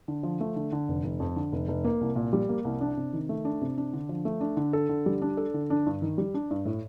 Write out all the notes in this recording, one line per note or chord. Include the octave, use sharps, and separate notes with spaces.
D3
F3
A3
D3
D3
F1
F1
F2
D3
F1
F1
A#3
C2
A#2
G3
A#3
C2
D4
C3
D#3
A3
D4
C3
D4
D3
F3
A3
D4
D3
A4
D3
G3
D4
A4
D3
D4
G2
D#3
G3
D4
G2
A2